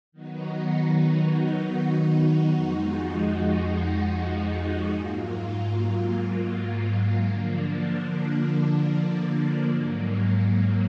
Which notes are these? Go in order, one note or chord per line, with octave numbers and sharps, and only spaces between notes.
D#3 F#3 B3 D#4 F#4
F2 F3 G#3 D#4 F#4
G#2 F#3 A#3 F4
D3 F3 A#3 D4
G#2 F#3 A#3